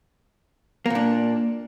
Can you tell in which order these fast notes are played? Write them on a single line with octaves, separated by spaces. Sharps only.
A#3 A#2 D4